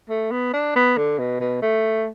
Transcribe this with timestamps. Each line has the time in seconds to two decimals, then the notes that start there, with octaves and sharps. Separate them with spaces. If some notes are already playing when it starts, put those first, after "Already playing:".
0.09 A3
0.31 B3
0.53 D4
0.75 B3
0.97 D3
1.19 B2
1.40 B2
1.62 A3